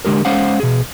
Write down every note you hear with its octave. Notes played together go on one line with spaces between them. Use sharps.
D3 G#3 G4 A#4
G#3 C#4 C5 F5 F#5
B2 G#4